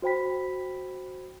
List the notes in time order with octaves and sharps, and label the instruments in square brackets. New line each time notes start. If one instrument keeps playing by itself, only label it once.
[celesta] F#4 C5 G5 B5 B6